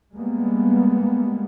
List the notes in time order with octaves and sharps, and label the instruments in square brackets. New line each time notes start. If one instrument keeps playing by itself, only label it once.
[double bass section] G3 G#3 A#3 B3